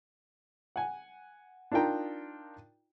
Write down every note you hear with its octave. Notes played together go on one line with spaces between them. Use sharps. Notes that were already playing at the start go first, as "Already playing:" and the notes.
F#5 G#5
D4 D#4 F4 A#4 G5 A#5